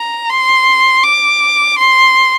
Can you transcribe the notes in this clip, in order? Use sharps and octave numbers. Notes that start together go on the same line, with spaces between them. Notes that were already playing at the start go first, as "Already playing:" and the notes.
Already playing: A#5
C6
D6
C6